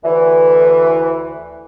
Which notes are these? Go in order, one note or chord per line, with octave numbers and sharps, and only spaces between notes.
D2 E3